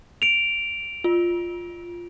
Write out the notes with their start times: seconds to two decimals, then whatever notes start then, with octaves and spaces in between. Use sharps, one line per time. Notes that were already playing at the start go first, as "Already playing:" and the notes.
0.22 D7 F7
1.04 F4